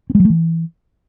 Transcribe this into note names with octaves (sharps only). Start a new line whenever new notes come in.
C4
G#3
F#3
A3
E3